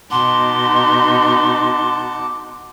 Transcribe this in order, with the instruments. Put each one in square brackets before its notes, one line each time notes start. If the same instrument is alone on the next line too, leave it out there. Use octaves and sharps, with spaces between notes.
[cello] B2 D#4 [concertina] F#5 A5 D6 [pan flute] C6